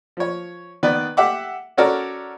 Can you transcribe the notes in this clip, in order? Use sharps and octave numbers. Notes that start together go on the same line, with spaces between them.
F3 C#5
D#3 B3 B4 D5
G4 E5 F#5 D6
C#4 F#4 A4 A#4 C#5 D5